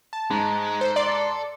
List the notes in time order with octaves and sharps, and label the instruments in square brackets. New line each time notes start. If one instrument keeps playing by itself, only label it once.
[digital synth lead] A5
[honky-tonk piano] G#2 [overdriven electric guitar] G#3
[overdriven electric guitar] A4 [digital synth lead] C5
[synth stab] D5 [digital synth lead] C6